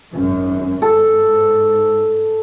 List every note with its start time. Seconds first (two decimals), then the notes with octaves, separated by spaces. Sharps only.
0.12 G#1 F#2
0.82 G#2 A4